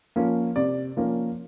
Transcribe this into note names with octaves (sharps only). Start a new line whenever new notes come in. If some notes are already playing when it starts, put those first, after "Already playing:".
F3 A#3 C#4
C3 D5
F3 A#3 C#4